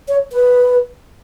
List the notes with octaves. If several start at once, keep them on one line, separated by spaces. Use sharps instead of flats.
C#5
B4